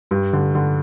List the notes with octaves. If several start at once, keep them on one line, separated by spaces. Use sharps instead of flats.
G2
D3
D3